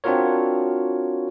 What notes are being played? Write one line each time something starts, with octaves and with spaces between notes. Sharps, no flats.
C4 D4 F4 F#4 A#4 C#5